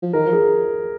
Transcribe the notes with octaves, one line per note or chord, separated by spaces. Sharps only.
F3
D#3 A#4
F3
G#4